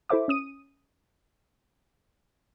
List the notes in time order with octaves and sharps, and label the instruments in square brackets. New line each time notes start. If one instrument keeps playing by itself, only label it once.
[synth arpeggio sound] E4 A4 C5 E5 D6
C#4 D#6 D#7